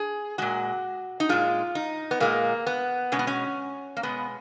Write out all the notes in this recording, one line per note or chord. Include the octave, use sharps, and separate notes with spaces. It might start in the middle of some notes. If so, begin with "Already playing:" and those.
Already playing: G#4
A#2 G#3 F#4
D#4
A#2 G#3 F4
D#4
B3
A#2 G#3 A#3
B3
B2 G#3 C#4
B3
C#4
A#3
B2 G#3 B3